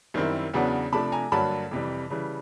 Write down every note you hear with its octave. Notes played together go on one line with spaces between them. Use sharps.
F#2 D#3 G3 C4 E4
E2 C#3 F#3 B3 D4
C3 F3 A3 D4 A5 B5
G#5 A#5
G2 D3 F#3 A#3 D4 A5 B5
F2 C3 E3 G3
C#3 E3 G3